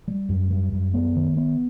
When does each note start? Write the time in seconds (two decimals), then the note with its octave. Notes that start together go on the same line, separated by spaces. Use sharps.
0.08 G3
0.29 F#2
0.50 G3
0.73 F#2
0.94 B3
1.16 D#3
1.37 B3